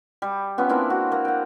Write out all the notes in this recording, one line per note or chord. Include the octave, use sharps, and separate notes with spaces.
G3
B3 C#4 F4
A#3 C4 D4 E4
F#4
A#3
F#5 G5